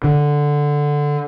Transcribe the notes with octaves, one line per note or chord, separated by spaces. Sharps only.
D3